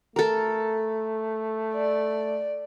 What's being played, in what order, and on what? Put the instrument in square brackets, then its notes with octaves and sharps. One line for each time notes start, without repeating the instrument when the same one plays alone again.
[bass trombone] A3 [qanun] A4 A#4
[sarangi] D5